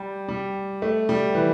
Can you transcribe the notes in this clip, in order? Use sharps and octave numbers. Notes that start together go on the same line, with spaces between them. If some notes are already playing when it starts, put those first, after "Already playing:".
Already playing: G3
G3
A3
G3
E3